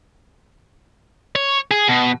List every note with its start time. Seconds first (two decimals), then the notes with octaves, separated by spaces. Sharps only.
1.35 C#5
1.71 G#4
1.89 B2